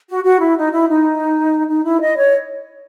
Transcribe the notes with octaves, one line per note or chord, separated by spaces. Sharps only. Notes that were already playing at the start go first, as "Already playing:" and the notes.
F#4
F#4
E4
D#4
E4
D#4
D#4
E4
D#5
C#5